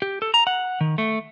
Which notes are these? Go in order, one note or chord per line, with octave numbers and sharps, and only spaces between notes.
G4
A4
A#5
F#5
D#3
A3